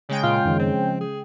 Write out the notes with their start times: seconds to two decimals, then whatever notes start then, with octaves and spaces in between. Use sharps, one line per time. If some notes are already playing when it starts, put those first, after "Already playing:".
0.09 C#3 G#3 G5
0.23 A#2 F4
0.45 F#2 D#3 F3
0.60 C4
0.72 F3
1.01 G#4